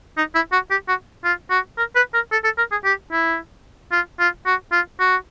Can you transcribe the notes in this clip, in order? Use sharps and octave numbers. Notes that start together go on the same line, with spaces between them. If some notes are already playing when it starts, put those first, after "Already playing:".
D#4
E4
F#4
G4
F#4
F4
F#4
A#4
B4
A#4
A4
A4
A#4
G#4
G4
E4
F4
F4
F#4
F4
F#4